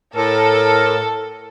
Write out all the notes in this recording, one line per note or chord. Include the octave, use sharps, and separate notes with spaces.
A2 A4 A#4